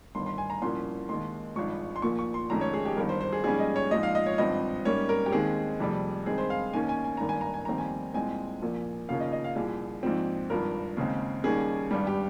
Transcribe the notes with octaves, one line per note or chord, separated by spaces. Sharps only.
G1 G2 D#3 C6
C6
G#5
A#5
C2 A#2 F3 A#3 C#4 C6
D#2 D#3 G#3 C6
G#1 G2 F3 G#3 C#6
C6
A#1 A#2 F3 A#3 C#6
C#6
C6
F1 F2 D#3 G#3 C#4 A#5
C#5
G#4
G4
G1 G2 D#3 A#4
C5
C5
G#4
A#1 G#2 G3 C#4 G#4
D#5
C#5
A#1 G#2 F3 G#3 D#5
F5
D#5
C#5
G#1 G2 F3 C4 D#5
G#2 G3 A#3 C#4 C#5
A#4
G4
D#2 D#3 G#3 C4 G#4
F1 F2 C3 G3
G2 D#3 G#3 C4 G#4
C5
F5
D#2 D#3 A#3 C#4 G#5
G#5
G#5
G#1 G2 D#3 A#3 A#5
G#5
A#5
G#5
F1 D#2 D#3 G3 C4 A#5
G#5
C2 A#2 G#3 C4 G#5
A#1 A#2 F3 A#3
D#2 C#3 F3 A#3 C#4 F5
D#5
D#5
F5
C2 A#2 F3 G#4
A#1 G#2 F3 C4
G#1 G2 F3 A#4
D#2 C#3 G#3 C4
D#2 D#3 G3 A#3 C#4 G#4
G#1 G2 G3
G4